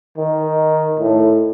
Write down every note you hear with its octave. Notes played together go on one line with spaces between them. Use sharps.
D#3
A2